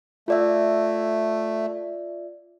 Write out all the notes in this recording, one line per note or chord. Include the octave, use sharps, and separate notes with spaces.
A3 F4 D5 E5